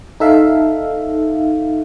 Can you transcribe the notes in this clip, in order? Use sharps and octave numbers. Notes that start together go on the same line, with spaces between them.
D#4 A4 E5 F5